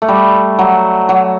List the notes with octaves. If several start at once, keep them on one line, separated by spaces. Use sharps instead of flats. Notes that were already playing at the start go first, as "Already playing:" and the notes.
A3
G3
F#3
F#3